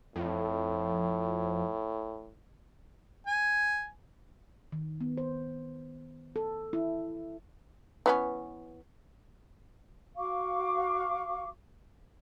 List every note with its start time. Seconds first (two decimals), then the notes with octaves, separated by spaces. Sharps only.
0.16 F2 A2
3.27 G#5
4.72 D#3
5.01 B3
5.18 C5
6.36 A4
6.73 E4
8.06 E3 B3 C#4
10.16 F#4 F5 C#6 D6